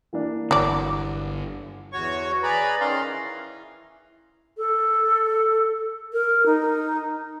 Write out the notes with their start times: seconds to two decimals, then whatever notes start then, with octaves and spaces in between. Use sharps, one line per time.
0.13 E3 A#3 D4
0.51 G1 D3 F#3 D5
1.92 E2 F#4 C#5 C#6
2.43 G#4 B4 D5 A#5 B5
2.81 D#3 C#4 F5 A#5 C6
3.08 E3
4.58 A4
6.13 A#4
6.46 D#4